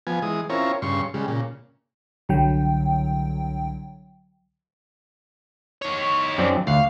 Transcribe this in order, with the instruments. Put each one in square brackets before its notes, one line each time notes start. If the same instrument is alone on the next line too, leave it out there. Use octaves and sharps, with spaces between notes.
[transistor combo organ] F3 B3 G#5
E3 G#3 D#6
C4 C#4 E4 F4 A#4 C#5
G2 C#3 C6 C#6
C#3 G3 G#3
A#2 C#3
[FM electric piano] C2 D3 F#3 G5
[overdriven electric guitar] D#3 C#5
[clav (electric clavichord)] F#2 C4 D5
[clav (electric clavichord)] D2 F#5 [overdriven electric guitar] F5